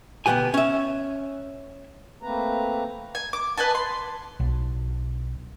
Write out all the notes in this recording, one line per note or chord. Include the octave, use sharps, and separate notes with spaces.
D2 B2 F3 B3 G4 G#5
C#4 E5
A3 A#3 C4 B4 A#5
G#5
D6
B4 D#5 G#5 A5
C6
B1